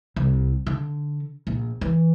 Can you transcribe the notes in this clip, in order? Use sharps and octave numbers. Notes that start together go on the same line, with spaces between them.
C2
D3
A#1
E3